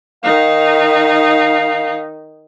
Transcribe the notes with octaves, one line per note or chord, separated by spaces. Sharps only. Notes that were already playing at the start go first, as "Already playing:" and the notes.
D#3 D#4 F5